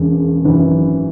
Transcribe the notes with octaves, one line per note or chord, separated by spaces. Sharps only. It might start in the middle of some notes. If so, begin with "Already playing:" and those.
Already playing: E1 E2 C#3
G#1 F#2 E3